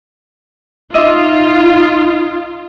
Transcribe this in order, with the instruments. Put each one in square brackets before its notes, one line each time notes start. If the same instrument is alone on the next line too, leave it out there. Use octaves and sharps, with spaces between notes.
[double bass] D#4 [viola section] F4 [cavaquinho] D#5 E5 D6